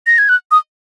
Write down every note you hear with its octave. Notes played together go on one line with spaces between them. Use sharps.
A#6
G#6
F#6
D#6